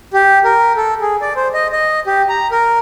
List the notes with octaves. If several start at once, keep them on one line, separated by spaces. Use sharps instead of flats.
G4
A#4
A4
G#4
D5
C5
D#5
D#5
G4
A#5
A#4